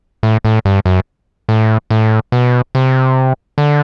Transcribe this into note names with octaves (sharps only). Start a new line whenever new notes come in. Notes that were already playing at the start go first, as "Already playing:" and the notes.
A2
A2
G2
F#2
A2
A2
B2
C3
D3